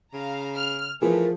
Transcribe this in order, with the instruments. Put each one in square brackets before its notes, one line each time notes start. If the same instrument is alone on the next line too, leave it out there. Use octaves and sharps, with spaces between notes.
[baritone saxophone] C#3 [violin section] F5 A#5
[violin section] F6
[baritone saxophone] E3 [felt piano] F3 G#4 [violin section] A3 [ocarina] A#4